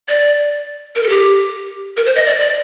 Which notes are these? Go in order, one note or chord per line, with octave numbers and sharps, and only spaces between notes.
D5
A#4
A4
G4
A#4
C5
D#5
D5
D5